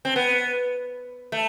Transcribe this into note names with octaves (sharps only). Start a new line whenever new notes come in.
C4
B3
A3